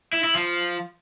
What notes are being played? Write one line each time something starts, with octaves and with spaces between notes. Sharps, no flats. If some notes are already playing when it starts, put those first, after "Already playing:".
E4
E4
F3